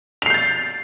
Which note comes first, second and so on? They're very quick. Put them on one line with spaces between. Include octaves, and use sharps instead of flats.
F7 C7 G6 A6